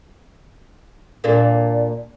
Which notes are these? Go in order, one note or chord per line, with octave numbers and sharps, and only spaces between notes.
A#2 A#3 D4